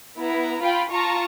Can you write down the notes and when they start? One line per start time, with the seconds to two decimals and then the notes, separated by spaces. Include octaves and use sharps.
0.18 B3 E4 A#5
0.63 F4 F5 G5 B5
0.92 F4 A5 A#5 C#6